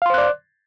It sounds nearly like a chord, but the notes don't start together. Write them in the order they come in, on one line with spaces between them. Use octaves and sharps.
F5 C6 C5 F#6 D5